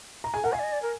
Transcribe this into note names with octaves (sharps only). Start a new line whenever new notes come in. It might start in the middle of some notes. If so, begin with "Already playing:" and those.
A#5
G#4 G#5
A#4 F#5
F5 G#5
D5
D#5
D5
A#4